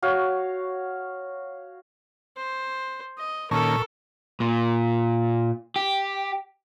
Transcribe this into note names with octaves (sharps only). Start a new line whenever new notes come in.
F#4 C#5 F5
C5
D#5
A#2 D#3 A#3 C#4 A4 A#4 A5 C#6
A#2
G4